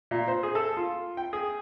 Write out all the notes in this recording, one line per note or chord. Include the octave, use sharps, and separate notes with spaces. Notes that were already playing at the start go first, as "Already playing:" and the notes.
A#2
C5
G#4
A4
F4
G5
G#4